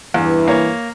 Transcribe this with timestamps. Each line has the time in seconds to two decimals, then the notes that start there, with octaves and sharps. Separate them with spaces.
0.14 E2 G2 E3
0.48 A#3 C#5